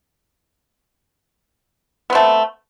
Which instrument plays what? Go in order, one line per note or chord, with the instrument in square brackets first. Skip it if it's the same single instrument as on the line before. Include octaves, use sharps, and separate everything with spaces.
[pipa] B3
C4
A3